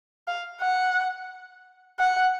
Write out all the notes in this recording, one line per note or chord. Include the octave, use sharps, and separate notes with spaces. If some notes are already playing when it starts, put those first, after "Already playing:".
F5
F#5
F#5